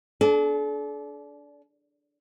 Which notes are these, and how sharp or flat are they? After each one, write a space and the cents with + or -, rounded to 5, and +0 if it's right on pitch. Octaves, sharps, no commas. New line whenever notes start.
D4 -20 A4 -45